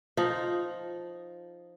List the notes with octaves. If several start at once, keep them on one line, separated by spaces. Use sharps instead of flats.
F3 D#4